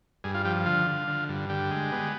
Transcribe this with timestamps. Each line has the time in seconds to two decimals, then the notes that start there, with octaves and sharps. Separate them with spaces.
0.24 G2 G#4
0.35 F4
0.45 F3 G4
0.66 D3 F4
0.87 D3
1.08 D3
1.29 G2
1.49 D3 G4
1.71 G#3
1.92 B3